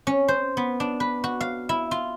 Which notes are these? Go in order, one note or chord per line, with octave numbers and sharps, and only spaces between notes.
C#4
C5
B3
D4
B4
F#4
F5
E4
F4